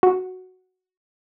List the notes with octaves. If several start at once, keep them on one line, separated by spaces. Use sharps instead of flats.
F#4